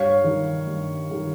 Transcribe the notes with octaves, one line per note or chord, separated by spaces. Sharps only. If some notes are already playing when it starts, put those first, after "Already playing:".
Already playing: G2 C#5 F5
D#3 G3
G2
D#3 G3